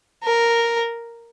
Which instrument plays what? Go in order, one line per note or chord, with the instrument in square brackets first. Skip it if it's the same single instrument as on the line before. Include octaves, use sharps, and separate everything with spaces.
[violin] A#4